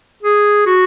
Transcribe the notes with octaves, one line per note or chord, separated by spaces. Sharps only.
G#4
F#4